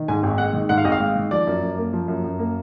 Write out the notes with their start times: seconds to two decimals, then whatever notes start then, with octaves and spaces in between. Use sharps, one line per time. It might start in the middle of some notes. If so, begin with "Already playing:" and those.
Already playing: D#3
0.08 G#2 G#5
0.23 G#1
0.38 G#3 F#5
0.53 D#3
0.69 G#2 F#5
0.78 F5
0.85 G#1 D#5
0.92 F5
1.00 G#3
1.15 D#3
1.31 F3 D5
1.47 F#2
1.63 F#2
1.78 A#3
1.93 F3
2.08 F#2
2.24 F#2
2.39 A#3